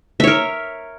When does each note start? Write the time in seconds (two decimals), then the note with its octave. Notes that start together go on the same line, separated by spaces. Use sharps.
0.20 E5
0.24 C#5
0.27 A#4